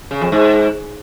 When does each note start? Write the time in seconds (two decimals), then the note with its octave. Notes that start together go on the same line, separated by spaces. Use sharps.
0.11 C#3
0.21 F2
0.32 G#2